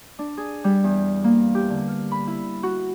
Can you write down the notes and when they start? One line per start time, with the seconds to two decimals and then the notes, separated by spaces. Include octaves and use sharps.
0.19 D4
0.37 G#4
0.64 G3
0.84 E2
1.24 A#3
1.55 G4
1.70 D3
1.88 F6
2.12 B5
2.27 E4
2.63 F#4